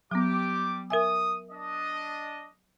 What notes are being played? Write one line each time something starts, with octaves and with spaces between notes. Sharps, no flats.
F#3 G3 B3 G4 D6
A#4 E5 G#5 D#6
D4 D#5